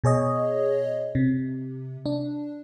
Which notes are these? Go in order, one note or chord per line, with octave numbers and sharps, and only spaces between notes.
B2 G#4 C#5 D#5
C3
D4